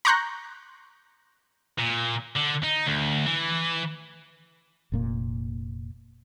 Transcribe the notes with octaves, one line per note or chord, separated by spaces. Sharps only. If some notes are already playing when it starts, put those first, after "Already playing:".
A#5 C6 C#6 F#6 G6 A#6
A#2
D3
D#4
D2
E3
F1 A#2 A#3